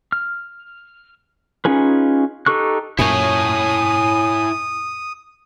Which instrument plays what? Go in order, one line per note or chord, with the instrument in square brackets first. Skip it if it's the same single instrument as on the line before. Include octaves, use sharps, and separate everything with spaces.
[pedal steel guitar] F6
C#4 D#4 F4 G#4 B4
D#4 G4 A4 C#6 F#6
[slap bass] F#2 A#2 [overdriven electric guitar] E4 C#5 [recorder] G#5 [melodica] D#6